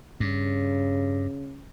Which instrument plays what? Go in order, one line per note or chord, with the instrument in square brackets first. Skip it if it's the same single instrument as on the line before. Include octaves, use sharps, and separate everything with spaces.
[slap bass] G2 [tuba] C#3